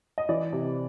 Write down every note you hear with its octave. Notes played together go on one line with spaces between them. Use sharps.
D#5
E3 D5
C3